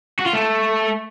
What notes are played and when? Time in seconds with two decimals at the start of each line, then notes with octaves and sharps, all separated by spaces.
0.19 F#4
0.26 F4
0.33 A3